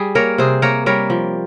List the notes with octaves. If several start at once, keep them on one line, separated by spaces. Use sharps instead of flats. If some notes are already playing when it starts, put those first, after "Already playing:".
Already playing: G3 G#4
A#3 A#4 C#5
C3 G#4 C5
A#3 A#4 C#5
G3 A#4 C#5
F3